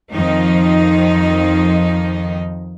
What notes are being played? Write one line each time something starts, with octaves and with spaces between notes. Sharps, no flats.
F2 D#3 F3 D#4